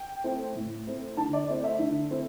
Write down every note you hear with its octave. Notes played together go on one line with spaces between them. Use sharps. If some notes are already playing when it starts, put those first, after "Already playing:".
Already playing: G5
A3 C4 E4
A2
A3 C4 E4
D3 A5
D5
A3 C4 E4 D5
E5
D3
A3 C4 E4